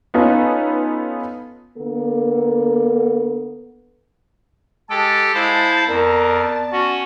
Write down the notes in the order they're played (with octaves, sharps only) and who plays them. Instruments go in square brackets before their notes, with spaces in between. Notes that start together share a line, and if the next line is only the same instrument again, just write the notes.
[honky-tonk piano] B3 C#4 D#4 F4 A4 B4
[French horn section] D3 A#3 B3 A4
[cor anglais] G#3 [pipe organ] G4 A4 G5 [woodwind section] A5
[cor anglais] G#3 [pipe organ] E4 C5 F5
[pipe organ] F2 [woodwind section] B3 D5 A5 [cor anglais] A#4
[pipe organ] C#4 [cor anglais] F#4